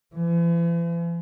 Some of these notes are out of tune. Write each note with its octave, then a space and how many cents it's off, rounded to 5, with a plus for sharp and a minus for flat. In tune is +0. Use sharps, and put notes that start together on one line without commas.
E3 +45